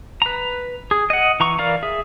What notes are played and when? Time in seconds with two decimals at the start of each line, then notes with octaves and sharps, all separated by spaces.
0.22 B4 A#5
0.91 G#4
1.10 D#5 F#5
1.40 E3 A#5 C#6
1.58 E3 A#4 D5 F5 A#5
1.83 G#4 E5